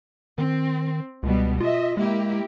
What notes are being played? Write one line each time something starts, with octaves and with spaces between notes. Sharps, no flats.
D#3 C4
C#2 B2 G3 B3
F4 D#5 E5
G#3 A#3 E4 G4